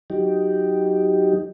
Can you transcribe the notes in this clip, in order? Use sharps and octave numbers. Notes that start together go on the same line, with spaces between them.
F#3 D#4 G4